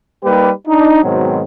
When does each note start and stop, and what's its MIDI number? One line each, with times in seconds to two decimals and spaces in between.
0.24 0.51 55
0.24 0.51 58
0.24 0.51 63
0.24 0.51 67
0.24 0.51 71
0.68 1.01 62
0.68 1.01 63
1.03 1.42 44
1.03 1.42 47
1.03 1.42 51
1.03 1.42 54
1.03 1.42 60